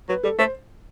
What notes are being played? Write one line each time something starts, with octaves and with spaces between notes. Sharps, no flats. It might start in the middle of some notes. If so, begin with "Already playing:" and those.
F#3 B4
G3 A4
A3 C5